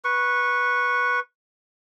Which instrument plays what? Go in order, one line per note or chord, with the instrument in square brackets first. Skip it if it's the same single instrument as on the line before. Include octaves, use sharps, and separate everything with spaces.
[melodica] B4 C#6